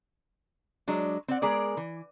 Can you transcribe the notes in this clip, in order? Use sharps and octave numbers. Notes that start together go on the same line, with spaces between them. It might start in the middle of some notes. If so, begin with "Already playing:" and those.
F#3 G#3 D4
C4 D5 F#5
G#3 B3 G#4 A#4 D5
E3